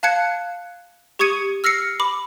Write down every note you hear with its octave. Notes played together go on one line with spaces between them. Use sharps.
F5 A5 F#6 G#6 C#7
G4 C#6 D#6 G#6 C#7 D#7
E6 F6 A#6 C7 C#7
B5 D6